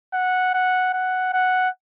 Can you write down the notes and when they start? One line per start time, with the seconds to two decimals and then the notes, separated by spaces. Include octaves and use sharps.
0.14 F#5
0.54 F#5
0.94 F#5
1.33 F#5